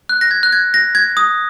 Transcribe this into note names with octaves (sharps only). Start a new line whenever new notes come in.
F#6
A#6
G#6
F#6
G#6
A#6
G#6
D#6